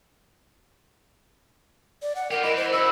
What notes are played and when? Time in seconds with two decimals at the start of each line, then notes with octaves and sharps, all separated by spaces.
2.02 D5
2.16 F#5
2.31 F4 G4 A#4
2.43 E3 D#5
2.57 C5
2.73 E4 F#4 C5 E6